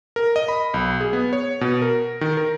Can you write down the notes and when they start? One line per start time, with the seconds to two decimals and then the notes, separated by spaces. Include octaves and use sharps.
0.16 A#4
0.36 D#5
0.48 B5
0.74 B1
1.01 G#4
1.13 B3
1.33 C#5
1.61 B2
1.82 A#4
2.21 D#3
2.37 A#4